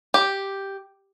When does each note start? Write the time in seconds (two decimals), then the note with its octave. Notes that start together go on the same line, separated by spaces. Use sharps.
0.14 G4